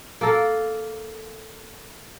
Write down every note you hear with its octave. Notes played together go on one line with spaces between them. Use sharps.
A#3 A4 A#4